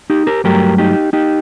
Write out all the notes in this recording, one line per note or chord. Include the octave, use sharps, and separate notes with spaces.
D#4 G4
G4 A#4
G2 F#3 A3 G4 A#4
D#4 G4
D#4 G4